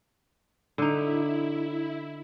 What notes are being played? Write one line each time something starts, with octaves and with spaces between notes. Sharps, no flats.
D3 D#4 E4